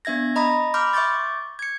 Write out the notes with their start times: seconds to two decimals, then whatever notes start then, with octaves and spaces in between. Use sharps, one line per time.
0.05 B3 D4 E5 G#6 A#6
0.36 D#5 A#5 B5 D#6 A#6
0.74 B5 C6 D6 F6 G6
0.93 E5 C#6 D6 G6 A6
1.59 G#6 C#7